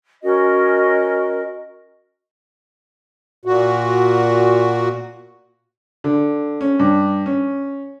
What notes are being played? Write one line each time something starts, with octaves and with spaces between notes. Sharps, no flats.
C#4 F#4 A#4 D#5
A#2 F#4
D3
C#4
G2
C#4